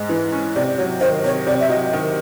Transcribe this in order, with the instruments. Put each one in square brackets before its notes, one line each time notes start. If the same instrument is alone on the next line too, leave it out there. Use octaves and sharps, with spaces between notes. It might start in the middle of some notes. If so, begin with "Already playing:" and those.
Already playing: [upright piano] G#2 G#3
E3
C#4
[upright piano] C3 [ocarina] D5
[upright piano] F#3 [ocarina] C#5
[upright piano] D#3 [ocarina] C5
[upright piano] C3 [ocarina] C#5
[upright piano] C3 [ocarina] D5
[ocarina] E5
[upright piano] F#3 [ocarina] D#5
[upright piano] D#3